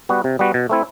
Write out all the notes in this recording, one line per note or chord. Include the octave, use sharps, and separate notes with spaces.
G3 B3 F#4
C3
G3 B3 F#4
B2
A3 C4 E4